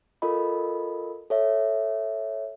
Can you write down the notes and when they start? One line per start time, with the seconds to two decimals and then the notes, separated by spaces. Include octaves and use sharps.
0.22 F4 A4 A#4 D#5 B5
1.30 A4 C#5 E5